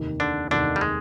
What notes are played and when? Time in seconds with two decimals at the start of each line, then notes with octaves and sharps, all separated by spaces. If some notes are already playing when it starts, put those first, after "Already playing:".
Already playing: F1 D#2 D#3
0.20 D3 D4
0.51 F1 D#2 D3 D#3 D4
0.76 G3
0.81 G#3